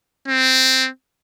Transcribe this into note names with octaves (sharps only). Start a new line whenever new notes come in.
C4